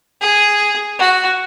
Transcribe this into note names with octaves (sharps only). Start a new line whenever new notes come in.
G#4
F#4